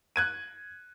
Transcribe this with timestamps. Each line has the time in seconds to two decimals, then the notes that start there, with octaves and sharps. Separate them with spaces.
0.16 F#6 G#6 D#7